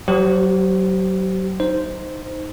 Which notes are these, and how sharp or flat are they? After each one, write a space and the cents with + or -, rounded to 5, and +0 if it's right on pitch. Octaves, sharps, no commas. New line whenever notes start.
F#3 +20 G4 -35 C5 -15
D#4 +0 C5 -5